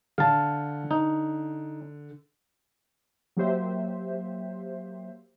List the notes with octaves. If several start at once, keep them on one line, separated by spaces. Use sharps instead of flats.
D3 F5 A5
D#4
F#3 A#3 G4 C5 E5